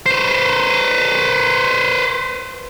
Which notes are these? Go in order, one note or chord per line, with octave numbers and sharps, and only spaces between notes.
B4 C5